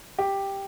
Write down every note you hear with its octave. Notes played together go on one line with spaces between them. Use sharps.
G4